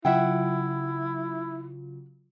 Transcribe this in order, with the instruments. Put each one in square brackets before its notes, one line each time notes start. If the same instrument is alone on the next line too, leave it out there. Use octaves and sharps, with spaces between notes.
[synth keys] C#3 F#3 F4 [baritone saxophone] E4 [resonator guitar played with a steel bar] E5 F#5 G5